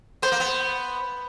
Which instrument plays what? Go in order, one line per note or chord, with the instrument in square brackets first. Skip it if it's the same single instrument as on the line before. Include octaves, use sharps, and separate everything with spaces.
[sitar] B3 [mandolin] C5
[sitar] A#3
B3